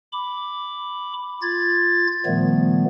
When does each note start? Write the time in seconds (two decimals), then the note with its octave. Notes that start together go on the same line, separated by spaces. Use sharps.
0.13 B5 D6
1.42 F4 G#6 A6
2.26 A#2 D#3 F3 G3 A3 B3